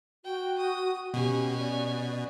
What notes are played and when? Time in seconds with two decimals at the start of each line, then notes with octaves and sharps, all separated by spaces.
0.25 F#4 G5
0.58 D#6
1.14 B2 C#4 G4 G#5
1.59 D5